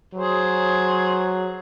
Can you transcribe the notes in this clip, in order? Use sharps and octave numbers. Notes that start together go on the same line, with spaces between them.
F#3 G#4 C5